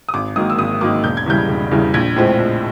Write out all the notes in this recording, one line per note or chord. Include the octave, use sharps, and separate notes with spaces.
D#6
G#1 D6
G#2 D#3 F#3 A#3 D#6
E6
G#1 D#6
G#2 D#3 F#3 A#3 D6
E1 G6
G#6
E2 C#3 E3 G3 G6
E1
E2 C#3 E3 G3
A#1 G#6
A2 F3 G#3 C4
A#1